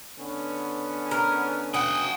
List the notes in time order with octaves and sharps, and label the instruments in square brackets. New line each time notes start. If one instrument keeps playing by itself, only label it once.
[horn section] D3 B3 C#4
[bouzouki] A#4
[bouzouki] F#4 [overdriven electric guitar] F#5 G5 [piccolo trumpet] D#6